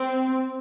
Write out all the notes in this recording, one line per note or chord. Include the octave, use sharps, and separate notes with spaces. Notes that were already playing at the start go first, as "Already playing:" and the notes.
Already playing: C4